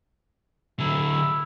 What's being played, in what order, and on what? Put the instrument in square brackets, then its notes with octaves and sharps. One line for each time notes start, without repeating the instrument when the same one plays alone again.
[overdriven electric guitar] D3 F#3 [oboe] E4